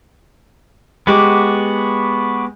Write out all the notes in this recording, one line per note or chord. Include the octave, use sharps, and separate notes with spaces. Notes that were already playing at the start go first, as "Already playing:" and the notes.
G#3 B3 F#4 G4 D6